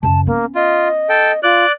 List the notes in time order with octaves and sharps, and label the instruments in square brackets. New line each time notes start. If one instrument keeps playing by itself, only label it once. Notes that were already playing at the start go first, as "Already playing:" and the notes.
[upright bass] F#2 C#3 [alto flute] A5
[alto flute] A#3 [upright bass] B3 C#4
[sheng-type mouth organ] F4 [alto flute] D#5
[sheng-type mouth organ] A4 G5
[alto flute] F4 [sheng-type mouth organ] D5 F#6